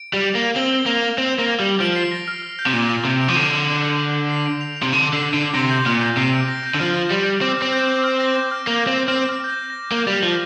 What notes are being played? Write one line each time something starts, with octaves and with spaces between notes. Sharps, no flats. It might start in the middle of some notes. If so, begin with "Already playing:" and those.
Already playing: D7
G3
F7
A#3
C4 G7
A#3 F7
C4
A#3
G3
F3 D7
C7
A#6
F6
F6
G6
C3
A#2 A#6
F7
C3 F7
D7
F3
D3 C7
D7
C7
D7
F7
F7
C3
D3 F7
D3 C7
D3 C7
C3 A#6
G6
A#2 F6
G6
C3 C7
D7
A#6
G6
D3
F3 F6
G3
C4 D6
F6
C4
G6
D6
F6
A#6
G6
F6
A#3 D6
C4
C4 F6
F6
G6
A#6
A#6
A#3 G6
G3
F6
F3